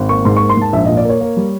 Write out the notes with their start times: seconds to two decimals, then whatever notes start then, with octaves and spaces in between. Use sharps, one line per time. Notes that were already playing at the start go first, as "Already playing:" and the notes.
Already playing: G#1
0.09 A#3 C#6
0.25 G#2 C6
0.37 A#3 C#6
0.49 C6
0.57 G#2 A5
0.73 A#1 E5
0.86 A#2 D#5
0.97 D5
1.05 A#3 C#5
1.21 A#3
1.37 G3